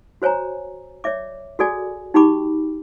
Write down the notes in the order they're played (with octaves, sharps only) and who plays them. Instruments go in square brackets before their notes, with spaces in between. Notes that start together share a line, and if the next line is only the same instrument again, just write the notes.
[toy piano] F#4 C5 C#5 G#5 A#5
C#5 D5 E5 D6
F#4 G#4 A4 D5 G#5
D#4 F#4 G4 G5 B5 D6